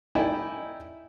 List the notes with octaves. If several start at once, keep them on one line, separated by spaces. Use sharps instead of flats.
D#4 E4 D5 E5 G5 G#5